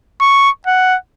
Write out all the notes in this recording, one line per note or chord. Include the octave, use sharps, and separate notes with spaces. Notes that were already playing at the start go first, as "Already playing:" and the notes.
C#6
F#5